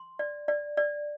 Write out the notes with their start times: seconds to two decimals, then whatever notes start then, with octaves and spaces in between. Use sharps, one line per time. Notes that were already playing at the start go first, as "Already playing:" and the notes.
Already playing: C6
0.19 D5
0.48 D5
0.77 D5